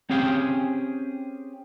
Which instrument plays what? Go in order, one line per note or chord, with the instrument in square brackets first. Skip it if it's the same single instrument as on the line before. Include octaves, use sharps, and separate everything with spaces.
[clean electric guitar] C4 C#4 G4 G#4 F5 G5